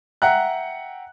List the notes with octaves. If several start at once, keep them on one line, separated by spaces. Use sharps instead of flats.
E5 F#5 G5 A#5 F#6